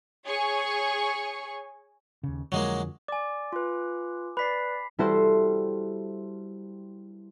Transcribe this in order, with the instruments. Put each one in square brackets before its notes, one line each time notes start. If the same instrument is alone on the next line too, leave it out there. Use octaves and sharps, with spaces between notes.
[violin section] G#4 C#5 G#5 C#6
[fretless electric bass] D#2 C#3
[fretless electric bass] F2 D3 F3 [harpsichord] F#3 G#3 A#3
[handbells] D5 [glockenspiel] G#5 D6
[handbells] F4 B4
[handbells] B4 D5 [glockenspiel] B5 B6 C7
[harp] G3 E4 F#4 A4 C5